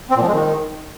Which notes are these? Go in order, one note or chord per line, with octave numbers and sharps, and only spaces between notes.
C4
A#2
F3
G#3
D#3